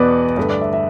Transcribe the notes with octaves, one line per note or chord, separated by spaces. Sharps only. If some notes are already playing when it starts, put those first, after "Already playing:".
Already playing: E2 B2 B3 B4 D5
G2 D3 A3 B4
D5
E5
E5